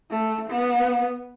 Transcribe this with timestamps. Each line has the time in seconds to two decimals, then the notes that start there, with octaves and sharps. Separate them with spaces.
0.11 A3
0.50 B3